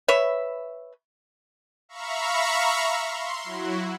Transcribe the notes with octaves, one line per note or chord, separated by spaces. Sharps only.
B4 C#5 E5
E5 F5 A#5 B5 C#6
C6
F#3 E4 F#4